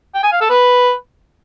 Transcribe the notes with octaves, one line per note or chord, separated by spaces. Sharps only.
G5
G#5
F5
A4
B4